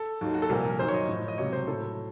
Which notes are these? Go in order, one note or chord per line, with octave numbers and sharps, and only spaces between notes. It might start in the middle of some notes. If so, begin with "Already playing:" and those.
Already playing: A4
D#2 D#3 F#3
F#4
A4
C2 A#2 F3 A#4
A#4
F#2 D#3 F#3 C5
C#5
D#5
A2 F3
D#5
C#2 C3 F#3 C#5
C5
A2 F#3 A4